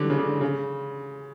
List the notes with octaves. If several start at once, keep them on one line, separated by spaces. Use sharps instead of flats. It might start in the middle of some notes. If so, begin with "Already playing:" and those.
Already playing: D3 E3 F#3 G3
C#3
D3
C#3